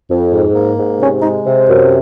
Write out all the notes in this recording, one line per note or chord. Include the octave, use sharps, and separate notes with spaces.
F2
G#2
A#3
G#2
C3 C#4
G#3 D#4
C3
F#2